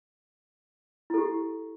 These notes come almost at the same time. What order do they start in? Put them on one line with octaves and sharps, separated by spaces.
E4 A4 G4